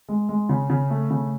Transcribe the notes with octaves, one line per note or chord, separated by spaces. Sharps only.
G#3
G#3
C#3
C#3
A3
C#3